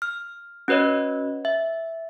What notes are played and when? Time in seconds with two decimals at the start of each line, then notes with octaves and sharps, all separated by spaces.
0.02 F6
0.68 C#4 F#4 B4 C#5 D#5
1.45 E5